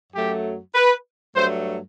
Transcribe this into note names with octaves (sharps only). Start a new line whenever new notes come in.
F#2 F#3 A3 G4
B4
G2 F#3 A3 C5